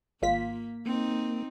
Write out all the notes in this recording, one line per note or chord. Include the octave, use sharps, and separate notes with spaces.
G#1 A#3 F4 B6
A#3 C4 D#4